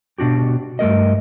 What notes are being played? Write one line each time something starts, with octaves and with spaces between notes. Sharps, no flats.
B2 D4 F#4 G4
G2 A3 A#4 D#5